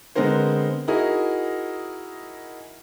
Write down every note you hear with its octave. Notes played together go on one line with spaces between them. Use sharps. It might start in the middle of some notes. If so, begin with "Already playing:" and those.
D3 G#3 B3 C4 A#4 C5
D#4 E4 F#4 G#4 A#4